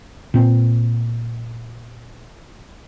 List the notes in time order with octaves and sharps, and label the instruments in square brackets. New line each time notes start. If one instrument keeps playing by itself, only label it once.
[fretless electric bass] A#2 C4